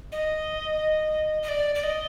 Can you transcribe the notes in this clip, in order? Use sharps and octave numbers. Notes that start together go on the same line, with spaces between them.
D#5
D#5
D5
D5
D#5